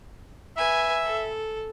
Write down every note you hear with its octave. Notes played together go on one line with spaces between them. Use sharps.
B4 E5 G#5
A4